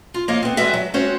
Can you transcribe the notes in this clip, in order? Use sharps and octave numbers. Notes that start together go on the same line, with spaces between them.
F4
F3 A#3 C#5 D#5 F5
B3 C4
E2 G2 G#3 F#4 B4 E5
F#3
G#3 C4 C#4 F#4 C5 C#5